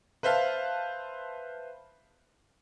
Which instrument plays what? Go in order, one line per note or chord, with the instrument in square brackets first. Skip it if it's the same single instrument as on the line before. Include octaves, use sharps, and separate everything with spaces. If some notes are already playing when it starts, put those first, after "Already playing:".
[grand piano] B4 C5 E5 F5 A5